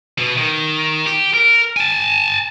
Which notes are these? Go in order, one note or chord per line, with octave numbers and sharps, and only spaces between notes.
B2
D#3
G4
A#4
G#5 A5